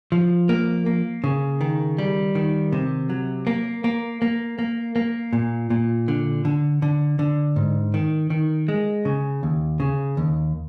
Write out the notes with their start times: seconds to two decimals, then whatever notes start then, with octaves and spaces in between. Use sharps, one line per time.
0.12 F3
0.49 A#3
0.86 A#3
1.24 C#3
1.61 D#3
1.98 G3
2.35 D#3
2.72 C3
3.10 F#3
3.47 A#3
3.84 A#3
4.22 A#3
4.59 A#3
4.96 A#3
5.33 A#2
5.70 A#2
6.08 D3
6.45 D3
6.82 D3
7.19 D3
7.56 G#2
7.94 D#3
8.30 D#3
8.68 G#3
9.05 C#3
9.43 D#2
9.80 C#3
10.17 D#2